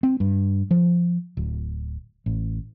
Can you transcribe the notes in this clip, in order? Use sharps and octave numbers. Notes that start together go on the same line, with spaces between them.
C4
G2
F3
D1
A1